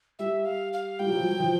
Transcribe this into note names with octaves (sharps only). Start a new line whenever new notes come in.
G3 E5
F5
F5
G3 G5
F#3
F3
F#3
F3